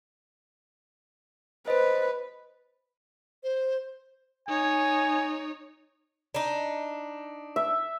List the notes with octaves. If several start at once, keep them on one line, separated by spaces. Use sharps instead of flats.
B4 C5 D#5
C5
D#4 C#5 G#5
D4 D#4
E5